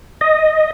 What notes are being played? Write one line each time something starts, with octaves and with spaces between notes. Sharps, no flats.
D#5